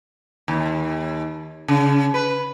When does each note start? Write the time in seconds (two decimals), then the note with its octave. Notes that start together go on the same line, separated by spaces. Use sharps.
0.48 D#2
1.68 C#3
2.14 B4